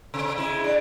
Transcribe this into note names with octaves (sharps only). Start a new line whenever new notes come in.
C3
G#3 E4
D4